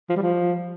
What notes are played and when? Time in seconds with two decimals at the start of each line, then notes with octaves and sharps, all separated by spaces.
0.10 F3
0.16 G3
0.23 F3